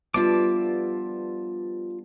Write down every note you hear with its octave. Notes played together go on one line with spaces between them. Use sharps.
F3 G3 B3 D4 F4 E5 A5 D6